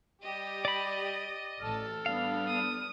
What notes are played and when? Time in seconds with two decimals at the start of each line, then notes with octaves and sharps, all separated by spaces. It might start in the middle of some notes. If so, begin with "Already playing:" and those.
0.23 G3 G4 D#5
0.65 D5 B5
1.61 A1 A4 A5 F6
2.06 G3 B3 D4 F5
2.47 D#6